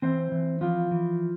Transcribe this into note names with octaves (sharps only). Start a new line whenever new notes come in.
E3 C4 C5
E3
E3 F3 F4
E3